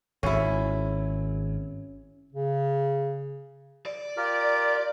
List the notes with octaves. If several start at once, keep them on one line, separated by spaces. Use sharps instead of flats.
G#1 C#4 E4
C#3
D5
F4 G4 A#4